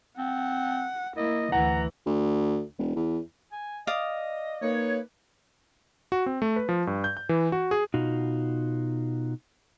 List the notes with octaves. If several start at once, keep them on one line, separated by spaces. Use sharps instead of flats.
C4 F#5
A#3 E4 D#5
D2 E3 E4 F#5 A#5
D2
E1
E2
G#5
D5 D#5 F5 D#6
A#3 D#4 B4 C#5
F#4
C4
A3
B4
F3
G2
G6
G6
E3
F#4
G#4
B2 D#4 F4 F#4